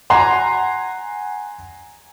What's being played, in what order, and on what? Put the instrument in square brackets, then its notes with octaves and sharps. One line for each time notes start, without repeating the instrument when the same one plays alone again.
[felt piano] F#5 C6 [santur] G#5 A#5